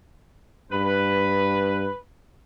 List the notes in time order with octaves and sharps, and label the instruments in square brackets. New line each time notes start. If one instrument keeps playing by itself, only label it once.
[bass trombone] G2 [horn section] B4